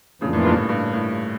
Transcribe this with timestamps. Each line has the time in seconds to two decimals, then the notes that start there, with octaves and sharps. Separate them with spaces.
0.21 F2 A2 C#3 E3 A#3 D4 F4
0.33 A2
0.45 G2 A#2
0.57 A2
0.69 G2
0.93 A2